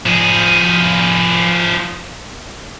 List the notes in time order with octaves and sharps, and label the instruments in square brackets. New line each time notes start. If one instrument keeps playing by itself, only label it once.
[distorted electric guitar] F3 G#4